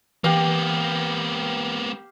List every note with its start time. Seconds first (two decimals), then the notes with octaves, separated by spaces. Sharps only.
0.24 E3 A#3 B3 G4 F5